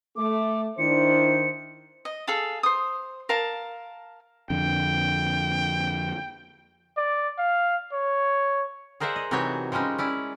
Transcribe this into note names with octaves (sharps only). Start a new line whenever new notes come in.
A3 D6
D#3 D4 E4 C5 C#7
D#5
G#4 A4 F5 A5
C5 D#6
A#4 F5 A5
F2 D3 G5
D5
F5
C#5
G#4 A#4 C5 D5 E5 F#5
D#5
C3 E3 F#3 D#4 F#4 C#5
F3 G3 G#3 C#4 D#4
C#4 E4 D5